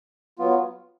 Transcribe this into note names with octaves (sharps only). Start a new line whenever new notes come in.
F#3 B3 F4